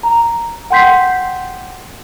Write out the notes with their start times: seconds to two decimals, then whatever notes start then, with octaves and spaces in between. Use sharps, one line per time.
0.03 A#5
0.70 F#5 G5 C6 G6 B6 C7